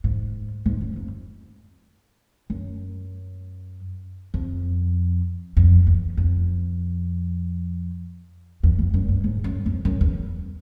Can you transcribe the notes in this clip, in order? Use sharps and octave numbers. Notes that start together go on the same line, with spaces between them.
G#2
G#2
F#2
F2
F#2
F2
F2
E2
F2
E2
F2
F#2
G2
G#2
F#2
F2
F#2
E2